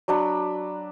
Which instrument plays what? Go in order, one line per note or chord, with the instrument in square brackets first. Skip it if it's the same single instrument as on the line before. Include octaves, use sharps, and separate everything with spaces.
[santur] F#3 D4 B5